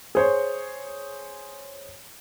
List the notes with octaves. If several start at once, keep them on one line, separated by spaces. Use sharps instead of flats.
G#4 C5 C#5